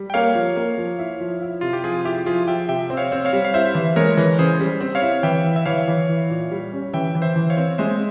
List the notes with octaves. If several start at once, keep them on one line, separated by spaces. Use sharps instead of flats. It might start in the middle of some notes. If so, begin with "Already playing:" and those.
Already playing: G3
G5
A#3 C#5 F5
F3
A#3
F3
E4
F3
E4
C3 F4
G4
F3 F4 G#4
E4 G4
F3 F4 G#4
F3 E5 G5
C3 E5 G5
C4
C#5 F5
C4
C#5 F5
G3
F5
E4 C5 E5
E3
G#3 A#4 C#5
E3
C#3 G#4 C5
G3
C4
C#5 F5
E4
E3 E5 G5
E4
E5
E3 C#5 F5
E3
E4
A#2
G3
C#4
E3 E5 G5
E3
C5 E5
E3
C#5 F5
C4
G#3 C5 E5